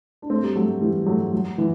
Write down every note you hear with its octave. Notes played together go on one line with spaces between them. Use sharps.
D4
A3 C4
G3
F#3 A3
E3 G3
F#3 A3
F#3
E3